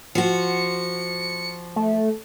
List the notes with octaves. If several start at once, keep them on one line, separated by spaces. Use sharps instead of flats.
F3 F#4 C#7
A3